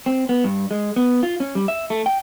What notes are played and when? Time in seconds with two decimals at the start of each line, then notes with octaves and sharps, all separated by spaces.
0.06 C4
0.29 B3
0.44 G2
0.71 G#3
0.96 B3
1.23 F4
1.40 C#4
1.55 G3
1.68 E5
1.90 A3
2.06 G5